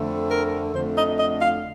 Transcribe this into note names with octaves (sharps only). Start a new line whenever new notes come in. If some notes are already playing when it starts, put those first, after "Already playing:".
Already playing: F2 D3 A3
A#4
F2 D3 A3 C5
D#5
D#5
F5